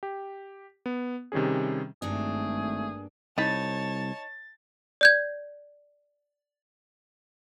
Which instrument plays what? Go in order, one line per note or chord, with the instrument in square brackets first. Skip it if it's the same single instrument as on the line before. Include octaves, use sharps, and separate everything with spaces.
[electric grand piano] G4
B3
C3 D#3 G3 C#4 G#4
[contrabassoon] G#1 [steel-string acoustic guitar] G2 A#3 D4 [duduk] A3 [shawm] G#4
[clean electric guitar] C2 [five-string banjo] D#4 B5 [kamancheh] C#5 A5 [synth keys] A6
[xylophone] D5 G6 G#6